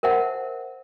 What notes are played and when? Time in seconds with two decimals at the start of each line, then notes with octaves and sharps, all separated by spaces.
0.03 A#4 C5 E5 F#5 A5